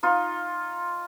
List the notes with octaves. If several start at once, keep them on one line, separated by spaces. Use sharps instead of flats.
D#4 F4